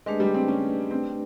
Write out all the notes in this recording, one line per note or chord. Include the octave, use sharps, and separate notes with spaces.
G#3 A3 D4 G4 B4 D5
G3
C4
C#4
C4